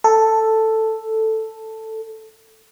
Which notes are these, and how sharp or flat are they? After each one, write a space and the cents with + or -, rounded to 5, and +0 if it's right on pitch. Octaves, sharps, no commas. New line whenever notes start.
A4 +5